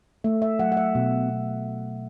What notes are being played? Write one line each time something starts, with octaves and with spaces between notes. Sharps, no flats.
A3 E5
E5
F#3 F#5
F#5
E5
B2
B2